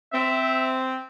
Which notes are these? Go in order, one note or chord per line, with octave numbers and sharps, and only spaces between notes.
C4 E5